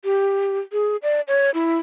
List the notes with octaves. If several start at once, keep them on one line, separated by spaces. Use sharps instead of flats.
G4
G#4
D5
C#5
E4